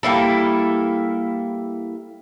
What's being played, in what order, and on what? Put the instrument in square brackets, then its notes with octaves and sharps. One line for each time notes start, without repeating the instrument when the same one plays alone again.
[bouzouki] G3 A#3 E4 A4